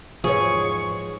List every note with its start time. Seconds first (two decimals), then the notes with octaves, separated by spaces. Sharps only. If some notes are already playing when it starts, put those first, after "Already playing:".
0.24 E2 G#2 F3 G#4 C#5 C#6